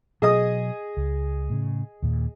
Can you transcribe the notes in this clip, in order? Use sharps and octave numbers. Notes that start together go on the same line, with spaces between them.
B2 F#3 G#4 D#5 D#6
C#2
A2 C#3
D#2 A#2